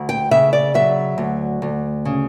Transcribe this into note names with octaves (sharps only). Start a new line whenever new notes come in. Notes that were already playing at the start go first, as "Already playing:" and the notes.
Already playing: D2
G5
C#3 E5
D5
F#3 E5
D2
D2
C#3